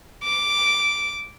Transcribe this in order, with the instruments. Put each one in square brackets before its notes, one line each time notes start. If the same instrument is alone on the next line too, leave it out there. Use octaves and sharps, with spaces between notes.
[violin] D6